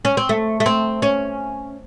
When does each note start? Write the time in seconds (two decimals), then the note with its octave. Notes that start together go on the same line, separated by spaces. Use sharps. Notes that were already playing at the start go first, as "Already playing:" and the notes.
0.05 C#4
0.17 C4
0.29 A3
0.60 A3
0.66 C4
1.02 C#4